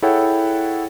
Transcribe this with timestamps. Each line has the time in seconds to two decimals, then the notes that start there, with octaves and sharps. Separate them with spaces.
0.02 E4 G#4 A4 C#5 F#5 G5